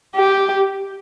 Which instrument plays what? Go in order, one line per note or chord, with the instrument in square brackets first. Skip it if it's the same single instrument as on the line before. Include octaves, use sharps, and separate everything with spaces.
[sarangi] G4